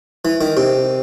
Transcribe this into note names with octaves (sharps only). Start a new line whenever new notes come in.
E3
D#3
C3